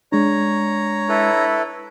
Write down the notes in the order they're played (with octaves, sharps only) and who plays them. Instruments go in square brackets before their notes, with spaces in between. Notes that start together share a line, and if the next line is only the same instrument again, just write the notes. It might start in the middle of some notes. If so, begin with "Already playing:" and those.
[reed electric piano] G#3 D4 [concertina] C#5 A#5
[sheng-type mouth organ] E4 A4 B4